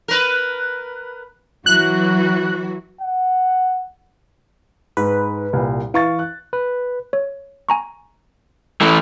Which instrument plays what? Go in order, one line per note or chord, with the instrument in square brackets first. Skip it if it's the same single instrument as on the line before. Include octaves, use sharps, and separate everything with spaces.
[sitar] A#4 B4
[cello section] E3 F#3 F#4 [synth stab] F#6
[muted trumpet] F#5
[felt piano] G#2 [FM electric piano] B4
[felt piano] C2 A#2
[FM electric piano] E3 [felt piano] F5 C#6 A6
[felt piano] F#6
[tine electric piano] B4
[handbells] C#5
G#5 A#5 C#6
[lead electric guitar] E3 A3